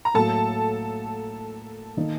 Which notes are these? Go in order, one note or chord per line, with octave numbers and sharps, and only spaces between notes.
A#5
A2 F#3 A#3 A4 A5
D#3 A#3 D#4